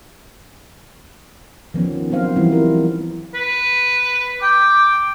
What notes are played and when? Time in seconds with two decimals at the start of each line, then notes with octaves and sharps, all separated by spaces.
1.74 D#3 F3 B3 C#4
2.10 F#3 B3 C4 C5 F5
2.36 E3 F3 G3 C4 E4
2.52 E4 A#4
3.34 B4
4.43 G5 D6